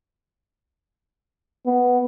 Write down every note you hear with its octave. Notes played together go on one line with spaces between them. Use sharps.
B3